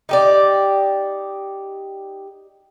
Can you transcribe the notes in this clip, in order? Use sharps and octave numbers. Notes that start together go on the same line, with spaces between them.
D#4 G4 D5